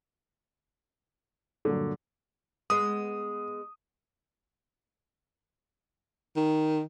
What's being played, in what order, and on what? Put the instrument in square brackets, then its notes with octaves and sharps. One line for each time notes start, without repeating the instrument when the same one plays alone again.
[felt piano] G2 A#2 F#3 [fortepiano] D3
[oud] G#3 B3 [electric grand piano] D#6
[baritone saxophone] D#3